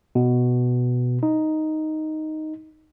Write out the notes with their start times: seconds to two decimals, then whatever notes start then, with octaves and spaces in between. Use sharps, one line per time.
0.15 B2
1.23 D#4